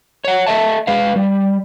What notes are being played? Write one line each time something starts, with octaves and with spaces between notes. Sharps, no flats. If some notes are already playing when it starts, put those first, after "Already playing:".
C#5 F#5
A4 D#5 E5 A5
G#3 B4 F5
G3